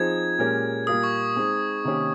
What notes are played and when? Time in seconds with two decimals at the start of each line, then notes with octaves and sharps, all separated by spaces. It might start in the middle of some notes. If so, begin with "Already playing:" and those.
Already playing: F3 C4 D#4 G#4 G#6
0.39 A#2 G#3 C#4 G4 A#4
0.87 A#2 G3 A#3 F4 A#4 D#6
1.03 C#6
1.36 G#3 C4 D#4
1.84 C3 D#3 A#3 C#4 G4